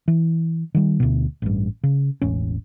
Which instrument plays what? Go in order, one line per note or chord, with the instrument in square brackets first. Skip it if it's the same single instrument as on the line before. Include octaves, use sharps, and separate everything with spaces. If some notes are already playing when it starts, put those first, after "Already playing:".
[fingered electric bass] E3
D#3 G3
D2 B2
A1 G2
C#3
E1 A1 C#4